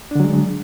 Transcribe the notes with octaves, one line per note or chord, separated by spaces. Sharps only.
D3 F#3 G#3 D4